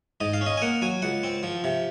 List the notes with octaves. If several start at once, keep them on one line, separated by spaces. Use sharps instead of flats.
G#2 D#5
F5
C#4
D#5
G#5
A#3 F#5
F#3 G#5
C#2 F#5
C4
F3
C3